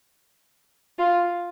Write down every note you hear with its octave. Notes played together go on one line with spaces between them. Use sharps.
F4